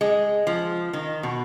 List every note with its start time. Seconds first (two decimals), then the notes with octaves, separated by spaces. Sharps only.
0.01 G#3
0.47 F3
0.93 D#3
1.23 B2